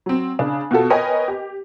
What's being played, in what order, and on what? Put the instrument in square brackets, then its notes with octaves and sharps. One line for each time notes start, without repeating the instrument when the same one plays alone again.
[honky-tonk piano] F#3 C4
C#3 D4
B2 F4 F#4 A4
A#4 B4 C#5 D#5 G5 G#5
G4